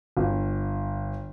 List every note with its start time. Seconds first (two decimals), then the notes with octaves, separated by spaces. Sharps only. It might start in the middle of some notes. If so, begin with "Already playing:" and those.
0.17 G1